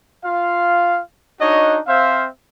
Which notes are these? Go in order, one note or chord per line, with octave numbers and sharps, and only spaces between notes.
F4 F5
D4 D#4 F#4 C#5 D#5
C4 C5 E5 F5